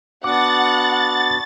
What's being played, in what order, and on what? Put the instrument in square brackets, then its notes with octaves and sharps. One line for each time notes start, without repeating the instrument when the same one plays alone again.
[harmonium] B3 D4 F#4 [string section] F#5 [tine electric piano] D6 [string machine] A6